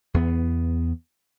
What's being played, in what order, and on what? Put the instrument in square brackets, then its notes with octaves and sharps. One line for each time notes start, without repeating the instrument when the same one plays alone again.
[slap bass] E2 B3